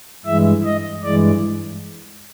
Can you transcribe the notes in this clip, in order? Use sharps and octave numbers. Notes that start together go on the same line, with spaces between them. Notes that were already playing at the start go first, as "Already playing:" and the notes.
G2 E3 G#3 E5
D#5
G2 E3 G#3 D5